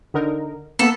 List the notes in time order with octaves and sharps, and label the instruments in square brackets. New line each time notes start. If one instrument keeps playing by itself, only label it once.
[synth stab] D3 D#4 A#4
[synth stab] A#3 B3 B5 [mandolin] A4